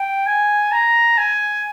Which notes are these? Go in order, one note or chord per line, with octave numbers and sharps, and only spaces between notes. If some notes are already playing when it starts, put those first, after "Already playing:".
Already playing: G5
G#5
A#5
G#5